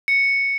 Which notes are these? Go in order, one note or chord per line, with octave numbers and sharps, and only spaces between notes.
C#7